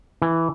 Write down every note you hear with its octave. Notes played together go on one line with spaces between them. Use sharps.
E3